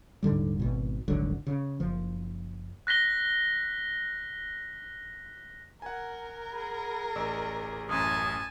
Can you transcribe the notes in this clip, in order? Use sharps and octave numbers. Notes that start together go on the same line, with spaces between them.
D#1 G#2 D3 G3
G#1 B2
D#1 G#1 D3 F#3
C#3
F#1 F3
F#6 A#6 B6 G7
A#4 F#5 G#5
G#4 B5
A1 D5 D#5 E6
A1 F#2 G#5 A5 D#6